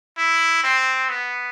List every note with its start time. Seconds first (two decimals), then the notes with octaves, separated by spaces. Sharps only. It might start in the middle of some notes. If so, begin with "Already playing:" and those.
0.18 E4
0.64 C4
1.09 B3